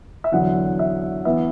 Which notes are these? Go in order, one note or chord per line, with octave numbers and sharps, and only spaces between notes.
E5
E2 D3 F#3 F#5
E5
E3 B3 E5